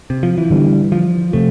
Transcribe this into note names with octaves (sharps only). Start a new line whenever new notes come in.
C3
F3
E3
D3 G3 B3
F3
C3 F3 A3